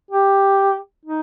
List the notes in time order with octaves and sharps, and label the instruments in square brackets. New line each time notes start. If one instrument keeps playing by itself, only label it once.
[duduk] G4
D#4